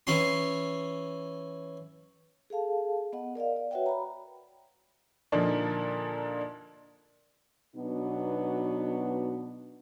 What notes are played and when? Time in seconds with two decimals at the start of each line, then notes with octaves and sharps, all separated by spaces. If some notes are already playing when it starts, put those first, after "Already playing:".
0.07 E3 C#4 C6
2.50 G#4 A4 F5 A5
3.13 B3 D#5 F#5
3.35 A#4 D5 D#5 F5
3.56 D5
3.71 F#4 B4 C#5 E5 F#5 G5
3.86 A#5 B5
5.32 A#2 D3 F3 A#3 D4 D#4
7.75 B2 F#3 B3 D4 D#4